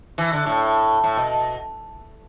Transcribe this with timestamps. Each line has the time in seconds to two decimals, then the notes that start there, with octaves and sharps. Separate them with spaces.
0.18 E3
0.33 D3
0.46 A2
1.04 A2
1.17 B2